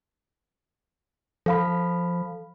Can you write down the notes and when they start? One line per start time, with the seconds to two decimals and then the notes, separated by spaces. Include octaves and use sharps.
1.46 F3 A4 F5 B5